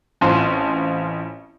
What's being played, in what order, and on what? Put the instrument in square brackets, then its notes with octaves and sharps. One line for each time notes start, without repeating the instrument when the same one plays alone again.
[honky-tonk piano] A1 C4 C#4 F4 A5 C6